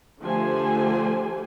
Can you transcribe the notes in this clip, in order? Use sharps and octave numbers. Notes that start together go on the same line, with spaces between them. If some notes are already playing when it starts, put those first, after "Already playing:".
D3 F3 A3 G4 C5 G#5